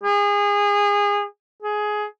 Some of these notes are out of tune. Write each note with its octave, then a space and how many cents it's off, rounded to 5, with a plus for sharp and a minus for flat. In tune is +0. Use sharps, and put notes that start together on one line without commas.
G#4 -25
G#4 +15